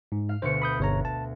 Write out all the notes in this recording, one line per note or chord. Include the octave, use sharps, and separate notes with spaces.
G#2
F5
D2 B2 C5 C#7
B5 D#6 G6
G1 C#5 A#5
A5